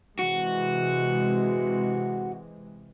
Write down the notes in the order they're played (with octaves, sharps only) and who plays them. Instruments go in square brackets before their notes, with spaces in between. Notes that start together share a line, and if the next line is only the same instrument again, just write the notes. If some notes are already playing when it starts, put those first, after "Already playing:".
[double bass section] C3 E3 G#3 [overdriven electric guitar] F#4